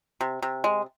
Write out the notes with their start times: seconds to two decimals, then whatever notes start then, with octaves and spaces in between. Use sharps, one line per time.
0.21 C3
0.42 C3
0.64 G#3